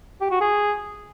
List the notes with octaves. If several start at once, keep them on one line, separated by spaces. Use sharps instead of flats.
G4
F#4
G#4